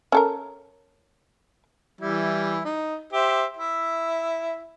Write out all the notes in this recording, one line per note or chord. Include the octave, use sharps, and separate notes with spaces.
C#4 A4 A#4
E3 G3 E4
D#4
G4 C5 E5
E4 E5